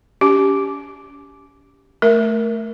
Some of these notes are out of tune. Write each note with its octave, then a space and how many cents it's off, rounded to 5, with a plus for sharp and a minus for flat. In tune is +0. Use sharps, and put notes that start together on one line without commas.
C#4 +35 G4 +0 D6 +0
A3 +0 A#4 +0 E5 +0